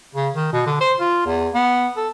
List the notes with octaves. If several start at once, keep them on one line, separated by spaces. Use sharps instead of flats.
C#3
D#3
B2
D3
C5
F4
E2
B3
A4